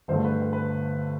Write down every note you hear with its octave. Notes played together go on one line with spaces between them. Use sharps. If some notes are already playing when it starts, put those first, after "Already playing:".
G1 G2 D3 A3 C5
B4
B4
B4